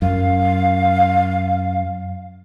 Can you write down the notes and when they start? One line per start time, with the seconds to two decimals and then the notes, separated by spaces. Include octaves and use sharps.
0.02 F#2 F5